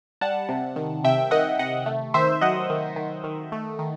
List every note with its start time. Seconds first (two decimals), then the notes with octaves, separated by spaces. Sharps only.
0.21 G3 F#5 A5
0.49 C3
0.76 D#3
1.04 C3 E5 G5
1.31 D#3 D#5 F#5
1.59 C3 D#5 F#5
1.86 A3
2.14 D#3 C5 E5
2.41 F#3 D#5 F#5
2.70 D#3
2.96 D#3
3.24 D#3
3.52 A3
3.79 D#3